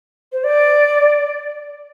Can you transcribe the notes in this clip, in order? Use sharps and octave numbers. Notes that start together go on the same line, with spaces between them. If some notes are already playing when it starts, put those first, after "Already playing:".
C5
D5